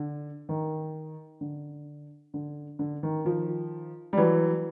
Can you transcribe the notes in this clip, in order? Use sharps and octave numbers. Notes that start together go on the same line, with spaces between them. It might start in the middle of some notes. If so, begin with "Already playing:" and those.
Already playing: D3
D#3
D3
D3
D3
D#3
D#3 F3
G3
E3 F#3